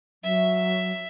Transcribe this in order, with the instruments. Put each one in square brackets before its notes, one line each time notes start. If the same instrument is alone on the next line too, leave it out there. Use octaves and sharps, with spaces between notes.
[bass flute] F#3 [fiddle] E5